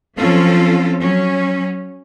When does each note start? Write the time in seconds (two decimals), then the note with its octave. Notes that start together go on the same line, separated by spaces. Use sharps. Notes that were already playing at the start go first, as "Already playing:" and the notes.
0.17 F3 F#3 C4 C#4 F4 A4
0.99 F#3 C#4